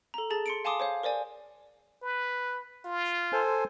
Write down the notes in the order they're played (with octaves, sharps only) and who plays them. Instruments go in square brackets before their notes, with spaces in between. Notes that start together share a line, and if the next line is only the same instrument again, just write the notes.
[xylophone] A4 A#5
G#4 A5 A6
C6 C#7 D7
F5 G#5 A5 C6 D6 D#6
C5 C#5 F5
A#4 C5 D5 G#5
[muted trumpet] B4
F4
[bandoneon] A4 C5 G#5